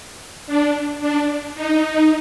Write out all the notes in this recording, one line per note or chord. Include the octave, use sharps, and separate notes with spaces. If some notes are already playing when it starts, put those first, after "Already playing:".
D4
D4
D#4